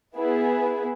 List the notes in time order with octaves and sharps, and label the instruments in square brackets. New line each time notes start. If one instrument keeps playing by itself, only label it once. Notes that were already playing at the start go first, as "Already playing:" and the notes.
[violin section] B3 E4 G#4 B4